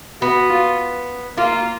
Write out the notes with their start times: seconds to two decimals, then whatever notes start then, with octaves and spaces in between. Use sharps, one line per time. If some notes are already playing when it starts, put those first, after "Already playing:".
0.21 B3 F#4
0.50 F4
1.37 A#3 F4